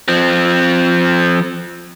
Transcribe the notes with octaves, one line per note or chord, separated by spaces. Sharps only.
F3 C4